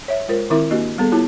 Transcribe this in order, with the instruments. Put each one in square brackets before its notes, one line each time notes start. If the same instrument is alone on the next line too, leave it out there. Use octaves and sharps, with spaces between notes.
[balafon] C#5 E5
G#3 F4 A#4 C5
D#3 C4 E4 A#4 E5 D6
A#3 D4 F#4 G4 D#5
G3 B3 G#4 A4
B3 E4 F4 G4 C#5 A5